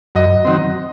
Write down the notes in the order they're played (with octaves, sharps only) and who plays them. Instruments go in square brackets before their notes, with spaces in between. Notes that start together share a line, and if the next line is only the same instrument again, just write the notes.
[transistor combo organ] F#2 [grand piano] D#5
[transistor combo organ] D#3 F#3 C4